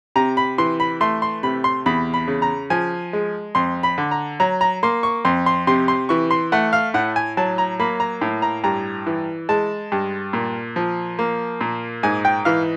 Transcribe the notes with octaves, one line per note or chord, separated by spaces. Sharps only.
C3 A#5
B5
E3 C6
B5
A3 C6
C6
C3 B5
C6
E2 B5
B5
C#3
A#5
F3 G#5
G#3
F2 C6
B5
D3
A#5
F#3 A#5
A#5
A#3 C6
C#6
F2 C6
C6
C3 C6
C6
E3 C#6
C6
A3 F#5
F5
A2 F#5
G#5
F#3 A5
A#5
A#3 B5
A#5
A2
A#5
G2 A#5
E3
G#3 A5
G2
A#2
F3
A#3
A#2
G#2 G#5
G5
E3 F5